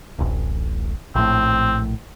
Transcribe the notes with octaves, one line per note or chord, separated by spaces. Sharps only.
D1 A1
A#1 A2 C4